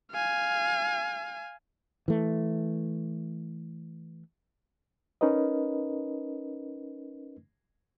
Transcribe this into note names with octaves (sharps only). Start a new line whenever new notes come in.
F5 G#5
E3 A3
C#4 D#4 A#4 B4 D#5